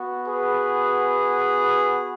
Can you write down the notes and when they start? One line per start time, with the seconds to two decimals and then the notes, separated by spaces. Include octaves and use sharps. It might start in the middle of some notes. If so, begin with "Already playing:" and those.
Already playing: B3 F#4
0.27 G#4 B4